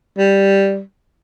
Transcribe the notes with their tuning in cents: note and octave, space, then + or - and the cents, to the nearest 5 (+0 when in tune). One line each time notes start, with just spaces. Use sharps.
G3 +0